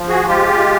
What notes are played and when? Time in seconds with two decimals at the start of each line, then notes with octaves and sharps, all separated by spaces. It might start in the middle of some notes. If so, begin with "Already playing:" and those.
Already playing: F3
0.09 F#4 G#4
0.28 G#3 F4 G4